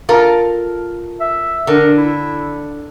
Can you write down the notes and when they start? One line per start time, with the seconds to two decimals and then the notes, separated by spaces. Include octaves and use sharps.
0.09 F4 A4 A#4
1.20 E5
1.67 D3 A#4
1.97 E4